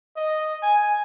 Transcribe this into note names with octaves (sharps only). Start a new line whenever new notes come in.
D#5
G#5